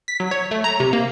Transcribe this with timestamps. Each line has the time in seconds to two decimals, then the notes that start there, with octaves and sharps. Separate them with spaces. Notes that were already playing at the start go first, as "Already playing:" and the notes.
0.08 B6
0.20 F#3
0.31 C#5
0.51 A3
0.64 A#5
0.80 C3
0.93 A#3